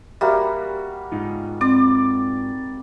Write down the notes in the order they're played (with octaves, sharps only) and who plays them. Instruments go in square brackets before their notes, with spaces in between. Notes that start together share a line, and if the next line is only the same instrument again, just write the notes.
[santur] G3 A#3 F#4 [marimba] E5
[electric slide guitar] G#2 D#4 F4
[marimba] C4 [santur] D5